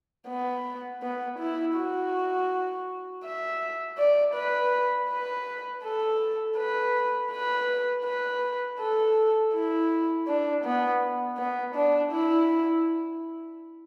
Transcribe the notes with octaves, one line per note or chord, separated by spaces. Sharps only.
B3
B3
E4
F#4
E5
D5
B4
B4
A4
B4
B4
B4
A4
E4
D4
B3
B3
D4
E4